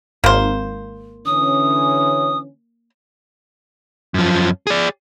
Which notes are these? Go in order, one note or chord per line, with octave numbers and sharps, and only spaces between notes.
G#1 A#3 C5
D3 E3 C#4 D#6
F#2 F3
G#4 D5